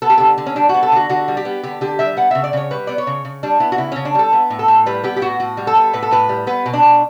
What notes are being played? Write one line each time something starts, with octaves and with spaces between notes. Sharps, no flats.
B3 A4
G4
D3 A4
D3
C#4
G3 D4
F#4
B3
A4
D3 F#4
D3 F#4
G3
G4
B3
D3 G4
D3 G4
G3 E5
B3 F#5
C#3 E5
D5
C#3 C#5
G3 B4
B3 D5
C#5
C#3
C#3
G3 D4
B3 E4
F#4
C#3 E4
C#3 C#4
D4
G3 A4
B3
A2
A4
A2
G3 B4
B3 G4
G4
A2 F#4
A2 F#4
G3
A4
B3
A2 B4
A4
A2 B4
G3
B3 B4
B2
D4
B2